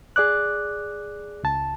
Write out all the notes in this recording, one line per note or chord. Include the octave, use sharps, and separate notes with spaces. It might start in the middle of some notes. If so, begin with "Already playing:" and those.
G#4 D5 D6 F#6
C#2 A5